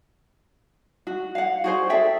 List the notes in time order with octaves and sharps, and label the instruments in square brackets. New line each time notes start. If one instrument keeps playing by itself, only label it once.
[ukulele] F#4
F5 F#5
F#4 G#4 C5
G#4 A4 E5 G5